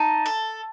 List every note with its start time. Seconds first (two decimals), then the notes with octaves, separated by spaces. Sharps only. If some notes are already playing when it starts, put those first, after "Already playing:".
Already playing: D#4 A5
0.26 A4